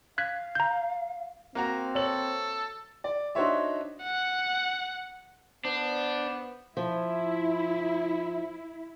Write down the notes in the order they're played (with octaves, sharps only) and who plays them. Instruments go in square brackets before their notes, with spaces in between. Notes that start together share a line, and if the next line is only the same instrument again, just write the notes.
[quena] F5 [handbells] F#6 G#6 B6
[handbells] A#5 G6
[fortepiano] A#3 F#4 A#5 [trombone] C4
[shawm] A4 [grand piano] C#5 F#7
[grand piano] D5
D4 D#4 F#4 C5 C#5 E5
[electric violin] F#5
[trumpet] B3 [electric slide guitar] D4 [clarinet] C5
[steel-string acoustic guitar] F3 [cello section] E4